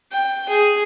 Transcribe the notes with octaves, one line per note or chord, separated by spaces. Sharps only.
G5
G#4